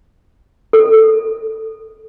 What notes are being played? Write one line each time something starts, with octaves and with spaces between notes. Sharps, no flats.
A4